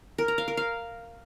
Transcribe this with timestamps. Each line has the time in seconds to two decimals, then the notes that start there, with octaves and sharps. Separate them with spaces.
0.18 A#4
0.28 A#5
0.38 F5
0.48 A#4
0.57 F5